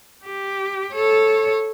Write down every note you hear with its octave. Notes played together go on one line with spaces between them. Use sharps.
G4
A4 C#5